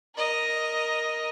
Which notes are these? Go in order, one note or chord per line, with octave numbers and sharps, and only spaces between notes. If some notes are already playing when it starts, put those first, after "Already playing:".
A#4 D#5